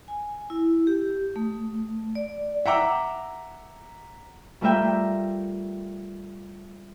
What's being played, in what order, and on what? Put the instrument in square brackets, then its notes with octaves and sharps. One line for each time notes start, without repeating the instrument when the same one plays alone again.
[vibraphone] G#5
E4
G4
A3
D5
[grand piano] E5 F#5 G5 A#5 D6 E6
[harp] G3 A3 F4 A#4 E5 G5